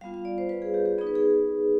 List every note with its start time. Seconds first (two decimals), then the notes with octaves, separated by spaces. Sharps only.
0.01 G3 B3 F4 F5
0.14 F5
0.25 D5
0.38 C5
0.49 B4
0.62 G#4
0.74 G4
0.86 G4
0.98 B3 D#4 G#4
1.07 B4
1.15 G#4